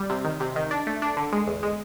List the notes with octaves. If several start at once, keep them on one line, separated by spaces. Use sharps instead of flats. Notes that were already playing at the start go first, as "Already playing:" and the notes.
Already playing: G3
C3
D#3
C3
D#3
D4
A3
D4
D3
G#3
E2
G#3